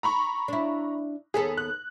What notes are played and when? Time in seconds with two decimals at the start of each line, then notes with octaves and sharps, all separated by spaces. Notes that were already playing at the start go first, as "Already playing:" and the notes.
0.03 A#5 B5 C#6
0.48 D4 E4
1.34 D#2 B3 G#4 A4
1.57 F#6